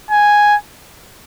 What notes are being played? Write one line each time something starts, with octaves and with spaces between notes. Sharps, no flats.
G#5